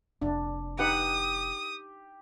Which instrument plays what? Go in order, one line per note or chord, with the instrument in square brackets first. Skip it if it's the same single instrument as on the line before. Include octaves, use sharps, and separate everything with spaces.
[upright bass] F1 A#3 [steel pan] D4
[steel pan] D#4 B4 F#5 [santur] G4 [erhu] D#6